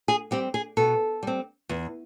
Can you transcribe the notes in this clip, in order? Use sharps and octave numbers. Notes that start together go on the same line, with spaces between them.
G#4
G3 C4 G4
G#4
B2 A4
G3 C4
E2